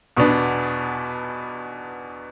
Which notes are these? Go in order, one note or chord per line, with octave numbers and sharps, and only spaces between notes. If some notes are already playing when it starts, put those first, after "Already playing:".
E2 B2 B3 D4